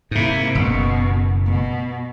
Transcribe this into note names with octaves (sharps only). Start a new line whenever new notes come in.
G#2 C3 A#3 E4
F#1 B2
B2